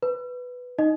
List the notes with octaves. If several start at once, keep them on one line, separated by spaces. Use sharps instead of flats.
B4
D#4 D#5